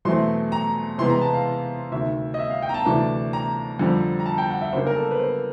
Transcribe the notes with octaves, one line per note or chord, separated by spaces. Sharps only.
E2 B2 F#3 A3 C4 C6
A#5
C3 E3 G#3 B3 C6
A#5
A5
F5
D2 C3 D#3 E5
D#5
E5
F5
G5
A#5
A5
D2 C3 E3 A3 D4
A#5
F2 D3 G3 C4
A#5
A5
G5
F#5
E5
C#3 F#3 A#3 D4 C5
A#4
A4
B4
C5